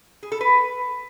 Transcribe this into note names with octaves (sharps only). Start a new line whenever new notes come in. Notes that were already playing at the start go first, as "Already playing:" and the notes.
G#4
A4
B4